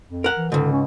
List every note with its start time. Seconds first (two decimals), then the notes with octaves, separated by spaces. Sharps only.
0.08 F2
0.24 A#4 F#5
0.37 E3
0.52 C#2 G#2 D3
0.73 C#4